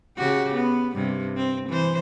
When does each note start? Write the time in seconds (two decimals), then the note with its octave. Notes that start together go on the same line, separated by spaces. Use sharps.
0.17 C#3 F#4 G4
0.55 B3
0.94 G2 C3
1.36 C4
1.69 E3 C5